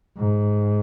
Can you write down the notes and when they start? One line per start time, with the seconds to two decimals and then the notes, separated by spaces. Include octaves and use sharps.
0.18 G#2